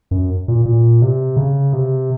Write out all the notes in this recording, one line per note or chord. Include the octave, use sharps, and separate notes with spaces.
F#2
A#2
A#2
C3
C#3
C3